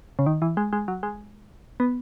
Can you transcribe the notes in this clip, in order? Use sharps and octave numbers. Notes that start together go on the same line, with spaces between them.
C#3
D#3
E3
G#3
G#3
F#3
G#3
B3